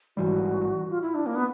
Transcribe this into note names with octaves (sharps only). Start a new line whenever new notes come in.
A1 G#2 E3 G3 F#4
F4
E4
D4
A#3
B3